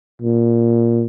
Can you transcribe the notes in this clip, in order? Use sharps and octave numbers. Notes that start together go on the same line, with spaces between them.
A#2